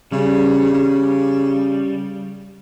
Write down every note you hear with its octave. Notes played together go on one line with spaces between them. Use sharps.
C#3 G3
C#3